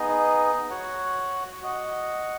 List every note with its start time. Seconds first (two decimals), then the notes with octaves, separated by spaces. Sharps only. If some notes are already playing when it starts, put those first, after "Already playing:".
Already playing: B3 D#4 G#4 D#5
0.70 F#4 C#5 F#5
1.62 F#4 D#5 F#5